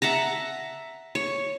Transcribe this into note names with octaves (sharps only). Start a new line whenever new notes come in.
E5 F#5 A5 A#5
C#5